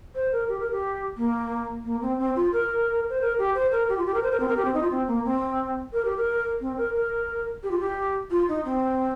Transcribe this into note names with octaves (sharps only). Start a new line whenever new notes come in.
C5
A#4
G4
A#4
G4
A#3
A#3
C4
C4
F4
A#4
C5
A#4
G4
C5
A#4
G4
F4
G4
A#4
C5
A#4
C4
A#4
G4
C4
D#4
F4
C4
A#3
C4
A#4
G4
A#4
C4
A#4
A#4
G4
F4
G4
F4
D#4
C4